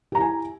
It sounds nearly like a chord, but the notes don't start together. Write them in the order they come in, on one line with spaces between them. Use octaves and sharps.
G4 A#5 E4 G#5